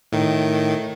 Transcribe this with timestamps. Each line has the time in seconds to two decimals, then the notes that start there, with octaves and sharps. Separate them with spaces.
0.12 A2 D#3